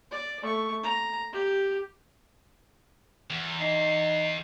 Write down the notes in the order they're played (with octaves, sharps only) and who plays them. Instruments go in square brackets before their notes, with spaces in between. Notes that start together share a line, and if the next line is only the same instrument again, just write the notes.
[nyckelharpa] D5
A3 C#6
A#5
G4
[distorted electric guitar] E2
[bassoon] D#4 [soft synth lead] C7